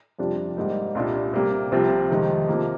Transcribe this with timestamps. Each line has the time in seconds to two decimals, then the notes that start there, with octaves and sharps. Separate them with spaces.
0.19 F2 C3 G3 D4 F4
0.57 G#2 G3 A#3 D#4
0.95 C2 A#2 G3 D4 F4
1.33 C3 G3 A#3
1.72 C2 C3 F3 C4 F4
2.10 F2 C3 D#3 G#3 D#4
2.48 C3 F3 A#3